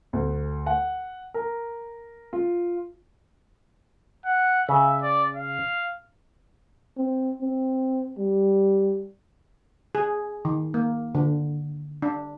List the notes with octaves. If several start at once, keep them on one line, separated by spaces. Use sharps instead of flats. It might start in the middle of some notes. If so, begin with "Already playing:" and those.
D2
F#5
A#4
F4
F#5
C#3 E5
D5
F5
C4
C4
G3
G#4
D#3
A#3
D3
D4